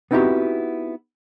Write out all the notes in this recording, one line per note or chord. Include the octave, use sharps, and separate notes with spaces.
B3 C4 D#4 E4 F#4 G4